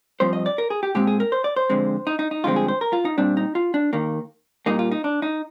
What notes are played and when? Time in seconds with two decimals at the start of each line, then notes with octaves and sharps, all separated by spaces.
0.20 G2 F3 C4 C5
0.33 D#5
0.46 D5
0.58 A#4
0.70 G#4
0.83 G4
0.95 A#2 G#3 C4 G4
1.07 G#4
1.20 A#4
1.32 C5
1.44 D5
1.56 C5
1.70 F2 D3 G#3 C4
2.07 D#4
2.19 D#4
2.31 D#4
2.44 G2 D3 F3 G#3 C4 F4
2.56 G#4
2.68 C5
2.81 A#4
2.93 F4
3.05 D#4
3.18 A#2 G3 C4 D4
3.37 D#4
3.55 F4
3.74 D4
3.93 D#2 D#3 A#3
4.66 A#2 G3 A#3 D#4
4.79 F4
4.91 D#4
5.04 D4
5.22 D#4